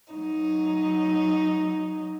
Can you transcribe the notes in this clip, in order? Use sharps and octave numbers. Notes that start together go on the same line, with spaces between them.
F#3 D#4